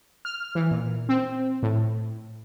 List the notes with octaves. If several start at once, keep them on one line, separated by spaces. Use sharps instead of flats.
F6
E3
A#2
C4
A2